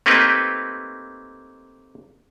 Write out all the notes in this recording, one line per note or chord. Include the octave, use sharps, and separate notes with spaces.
A3 A#3 C4 D#4 G4 B4